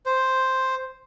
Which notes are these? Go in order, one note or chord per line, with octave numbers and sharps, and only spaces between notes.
C5